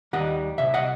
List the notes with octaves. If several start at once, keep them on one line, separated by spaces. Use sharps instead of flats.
D#2 D#3 G3 D#5 F#5
C2 C3 E5
D#5 F#5